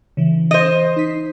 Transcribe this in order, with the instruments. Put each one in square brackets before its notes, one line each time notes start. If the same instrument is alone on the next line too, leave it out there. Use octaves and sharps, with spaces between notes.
[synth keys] C#3 E3
[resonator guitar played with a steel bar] C5 D#5
[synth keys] D#4 B6 C7